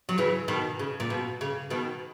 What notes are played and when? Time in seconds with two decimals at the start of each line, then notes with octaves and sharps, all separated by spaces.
0.09 F#3
0.18 C#3 E3
0.48 B2 D#3
0.79 C#3
1.00 A#2
1.10 B2
1.41 C#3
1.70 B2 D#3